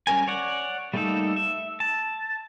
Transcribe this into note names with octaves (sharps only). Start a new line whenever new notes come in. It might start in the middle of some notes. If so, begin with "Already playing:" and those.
G3 C#4 A#4 G#5
C#5 D5 F#5
G3 A3 A#3 D#4 A4
E5
A5